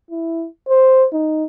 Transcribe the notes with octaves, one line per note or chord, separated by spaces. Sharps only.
E4
C5
D#4